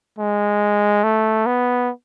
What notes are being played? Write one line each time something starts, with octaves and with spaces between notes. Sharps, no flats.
G#3
A3
B3